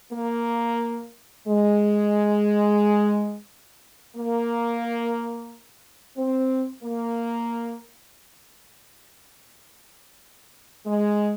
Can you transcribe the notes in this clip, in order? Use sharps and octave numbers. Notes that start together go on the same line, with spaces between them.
A#3
G#3
A#3
C4
A#3
G#3